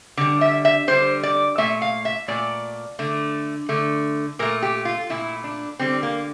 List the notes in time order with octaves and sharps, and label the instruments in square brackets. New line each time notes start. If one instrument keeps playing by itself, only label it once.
[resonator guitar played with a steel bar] D3 G3
E5
E5
D3 G3 C5
D5
A#2 A3 E5
F5
E5
A#2 A3 D5
D3 A3
D3 A3
A#2 A3 A#4
G4
F4
A#2 A3 E4
D4
D3 G3 C4
A#3